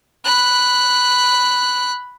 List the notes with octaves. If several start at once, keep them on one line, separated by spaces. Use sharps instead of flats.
B5 F#6